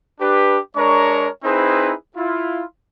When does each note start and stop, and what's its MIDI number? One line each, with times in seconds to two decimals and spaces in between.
0.21 0.58 62
0.21 0.58 67
0.21 0.58 71
0.76 1.28 56
0.76 1.28 62
0.76 1.28 70
0.76 1.28 73
0.76 1.28 82
0.76 1.28 85
1.44 1.94 60
1.44 1.94 63
1.44 1.94 64
1.44 1.94 68
1.44 1.94 71
1.44 1.94 72
2.16 2.62 64
2.16 2.62 65